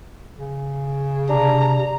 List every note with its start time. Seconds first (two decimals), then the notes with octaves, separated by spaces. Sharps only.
0.38 C#3
1.30 C3 D4 A#5